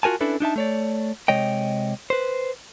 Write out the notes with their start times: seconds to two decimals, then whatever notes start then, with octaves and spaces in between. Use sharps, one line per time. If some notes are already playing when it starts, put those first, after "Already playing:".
0.03 F4 F#4 A#4 G#5 A5
0.21 C#4 D4 E4 A4 B4
0.40 D4 D#4 E5 A5
0.56 A3 C#5 D5
1.28 C3 G#3 C#5 D#5 G5
2.10 B4 C5